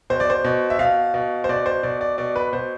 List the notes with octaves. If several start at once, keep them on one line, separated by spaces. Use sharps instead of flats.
B2 C5
D5
C5
B2
E5
B2 F5
B2
C5
B2 D5
C5
B2 D5
D5
B2 D5
B4
B2 C5